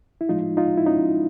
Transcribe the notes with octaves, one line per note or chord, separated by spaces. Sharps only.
E4
A2 F3 G#3 D#4 F4
D#4 F4
E4
C#4 D#4